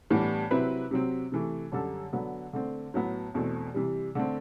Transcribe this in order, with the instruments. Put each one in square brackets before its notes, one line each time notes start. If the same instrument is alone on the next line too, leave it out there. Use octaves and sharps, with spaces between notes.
[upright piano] A2 E3 G3 B3 D4
C3 F#3 C4 E4 B4
C3 F#3 C4
C3 E3 A3
F#2 D3 G3 D4 A4
D3 F#3 B3
D3 A3 C4
A2 F#3 B3
E2 B2 A3 C4
C3 E3 G3
D3 A3 C4